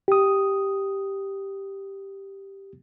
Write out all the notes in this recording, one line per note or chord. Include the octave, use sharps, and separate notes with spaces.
G4 D#6